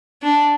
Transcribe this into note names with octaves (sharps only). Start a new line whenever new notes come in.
D4